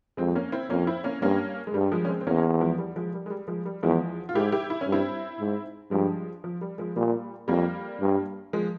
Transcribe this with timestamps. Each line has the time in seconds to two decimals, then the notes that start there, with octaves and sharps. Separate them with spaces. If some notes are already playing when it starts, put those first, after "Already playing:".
0.17 F2 G#3 C4
0.35 A#3 C#4
0.52 C4 E4
0.70 F2 A#3 C#4
0.87 C4 E4
1.04 A#3 C#4
1.22 G2 A#3 C#4
1.67 G#3
1.74 G2 G3
1.92 F3 G#3
2.05 C#4
2.08 G#3 C4
2.21 C4
2.27 E2 A#3 C#4
2.61 F3 G#3
2.78 G3
2.96 F3 G#3
3.14 G3
3.26 G#3
3.30 G3
3.48 F3 G#3
3.66 G3
3.83 E2 F3 G#3
4.29 F4
4.35 G#2 E4 G4
4.52 E4 G4
4.70 E4
4.81 C#4
4.87 G2
4.92 C4 E4
5.40 G#2
5.91 G2 F3 G#3
6.44 F3
6.61 G3
6.78 F3 G#3
6.96 A#2 G3
7.48 F2 G3 A#3
8.00 G2
8.53 F3 G#3